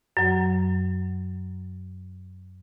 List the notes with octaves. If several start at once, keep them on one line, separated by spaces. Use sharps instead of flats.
F#2 F#3